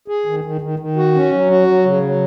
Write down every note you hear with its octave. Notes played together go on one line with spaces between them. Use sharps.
G#4
D#3
D#3
D#3
D#3
F#4
C#4
F#3
F#4
F#3
C#3
F#3